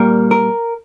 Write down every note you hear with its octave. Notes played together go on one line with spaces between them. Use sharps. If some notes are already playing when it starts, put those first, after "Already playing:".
Already playing: A#2 G3 A#3 A#4
A#4